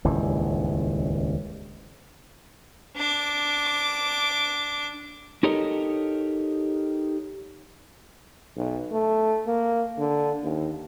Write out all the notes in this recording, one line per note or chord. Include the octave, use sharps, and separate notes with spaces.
D#1 C#2 G2 E3
D4 D6
D#4 G4 A4 A#4 C#5 D#5
B1
A3
A#3
D3
D#2